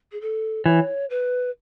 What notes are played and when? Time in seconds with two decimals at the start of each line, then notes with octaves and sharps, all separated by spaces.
0.12 G#4
0.21 A4
0.65 E3 C#5
1.10 B4